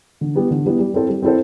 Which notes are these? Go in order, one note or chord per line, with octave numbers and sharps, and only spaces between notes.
D3
G3 B3 E4 G4
D3
G3 B3 E4 G4
G3
C4 E4 A4 C5
G3
C4 E4 A4 C5